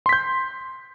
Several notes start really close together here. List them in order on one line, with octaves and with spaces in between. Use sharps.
C6 B6 G6